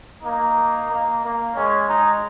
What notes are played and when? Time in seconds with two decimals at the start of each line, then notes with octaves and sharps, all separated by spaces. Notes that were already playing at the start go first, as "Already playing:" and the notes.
0.23 A#3 D#4
0.89 A#3
1.23 A#3
1.56 G#3 C#4
1.89 D#4